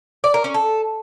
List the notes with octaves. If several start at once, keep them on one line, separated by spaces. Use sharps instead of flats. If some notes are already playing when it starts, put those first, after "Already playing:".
D5
A#4
C#4
A4